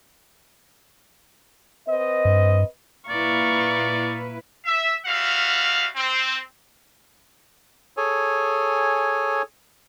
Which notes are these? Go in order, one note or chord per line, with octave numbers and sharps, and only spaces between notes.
C4 B4 D#5
G2
A#2 E4 B4 D5 F5 A#5 C#6
E5
G3 F#4 E5 F5
C4
G#4 A4 C#5 G#5